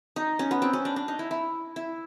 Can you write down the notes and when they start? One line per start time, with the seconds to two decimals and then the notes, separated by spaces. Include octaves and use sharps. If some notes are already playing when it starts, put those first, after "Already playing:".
0.16 D#4
0.39 C#4
0.51 B3
0.62 C4
0.73 C#4
0.85 D4
0.96 D4
1.08 D#4
1.19 E4
1.31 E4
1.76 E4